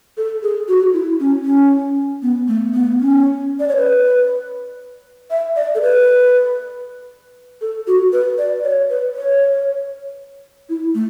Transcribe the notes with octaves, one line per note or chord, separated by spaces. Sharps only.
A4
G#4
F#4
E4
C#4
C#4
B3
A3
B3
C#4
D5
C#5
B4
E5
D5
A4
B4
A4
F#4
B4
D5
C#5
B4
C#5
E4
A3